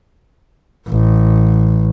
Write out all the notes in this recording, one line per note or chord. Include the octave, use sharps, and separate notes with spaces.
A1